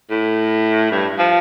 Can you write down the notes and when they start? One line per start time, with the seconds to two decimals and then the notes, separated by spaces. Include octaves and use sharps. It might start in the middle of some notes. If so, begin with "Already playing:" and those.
0.11 A2
0.91 G2
1.19 F3